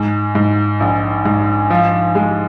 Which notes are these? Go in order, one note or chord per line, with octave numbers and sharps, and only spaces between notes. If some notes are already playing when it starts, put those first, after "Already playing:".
Already playing: G#2
G#2
A#1
G#2
F3
G#3